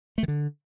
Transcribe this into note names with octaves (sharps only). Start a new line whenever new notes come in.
A3
D#3
D3